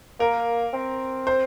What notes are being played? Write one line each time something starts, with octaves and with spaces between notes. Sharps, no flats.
A#3 A#4
C4
C5